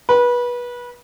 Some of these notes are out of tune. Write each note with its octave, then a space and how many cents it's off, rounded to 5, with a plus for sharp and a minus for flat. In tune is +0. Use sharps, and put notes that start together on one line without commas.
B4 -25